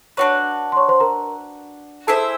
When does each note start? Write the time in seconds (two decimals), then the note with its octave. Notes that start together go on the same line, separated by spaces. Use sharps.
0.17 D4 F#4 B4 C#5 C#6
0.72 C6
0.77 C#5 C#6
0.89 C5 C6
1.00 A#4 A#5
2.07 E4 G#4 A4 C5 E5 A5